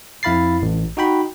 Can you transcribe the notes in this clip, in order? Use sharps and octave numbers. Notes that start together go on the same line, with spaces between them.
F2 E4 F5 B5 A6 C7
A1
D#4 F#4 G5 B5